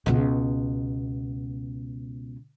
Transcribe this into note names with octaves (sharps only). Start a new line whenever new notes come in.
C#2 B2